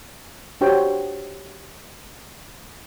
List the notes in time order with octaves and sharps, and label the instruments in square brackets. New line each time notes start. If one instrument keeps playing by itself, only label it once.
[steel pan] D4 F#4 G4 C5 C#5 G5